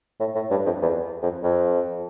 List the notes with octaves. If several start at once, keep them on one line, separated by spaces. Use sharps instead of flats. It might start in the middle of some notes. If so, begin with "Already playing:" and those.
A2
A2
G2
F2
E2
F2
F2